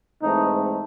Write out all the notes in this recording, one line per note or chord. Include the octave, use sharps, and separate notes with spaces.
G#2 E3 A3 C4 D#4